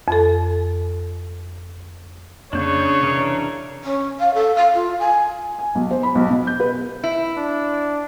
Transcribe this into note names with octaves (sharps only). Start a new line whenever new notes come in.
F2 A4
F2 C#3 A#3 D4 C#5 G6
C3 E3 D4 A#4
C#4
F5
A4
F5
F4
G#5
G#5
B1
C5
B5
B1
B2
G6
B4
E4
D4